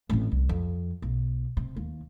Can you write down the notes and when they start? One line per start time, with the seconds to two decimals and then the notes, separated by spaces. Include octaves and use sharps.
0.10 A1 C4
0.32 C2
0.49 F2
1.02 B1
1.57 C3
1.76 D#2